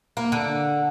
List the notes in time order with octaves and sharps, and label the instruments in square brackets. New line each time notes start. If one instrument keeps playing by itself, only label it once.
[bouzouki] A#3
D3